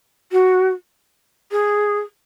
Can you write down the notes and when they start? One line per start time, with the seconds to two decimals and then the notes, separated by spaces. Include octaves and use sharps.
0.32 F#4
1.51 G#4